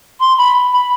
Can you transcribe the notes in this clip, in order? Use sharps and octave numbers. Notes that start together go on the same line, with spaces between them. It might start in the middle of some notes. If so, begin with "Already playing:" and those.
C6
B5
B5